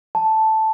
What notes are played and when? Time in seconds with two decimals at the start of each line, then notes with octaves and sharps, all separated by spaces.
0.15 A5